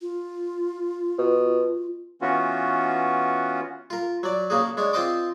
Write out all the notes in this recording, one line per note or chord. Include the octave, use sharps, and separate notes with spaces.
F4
B2
E3 B3 C#4 F4 F#4
F4 A#4
F#3 D5
C#3 A#3 F#4 G#4
G#3 D4 C#5
C4 F4 C5 D#5 C6 D6